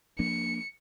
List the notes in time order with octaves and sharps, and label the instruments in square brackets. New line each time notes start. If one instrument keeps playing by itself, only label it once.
[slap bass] F3 A#3 D4 [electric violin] C#7